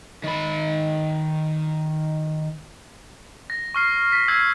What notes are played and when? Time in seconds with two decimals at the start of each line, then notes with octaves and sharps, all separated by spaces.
0.24 D#3 B5
3.50 A#6
3.74 C#6 F6 C7
4.12 A#6 B6
4.28 E6 G6 G#6 C7